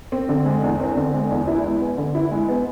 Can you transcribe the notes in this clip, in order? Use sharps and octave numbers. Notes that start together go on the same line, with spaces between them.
C4
D3
G#3
E2
C4
D3
G#3
E2
E4
G#3
B3
D3
E4
G#3
B3